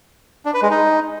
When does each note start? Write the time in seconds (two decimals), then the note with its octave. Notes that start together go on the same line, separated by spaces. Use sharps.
0.45 D4
0.54 B4
0.62 G#3
0.71 D#4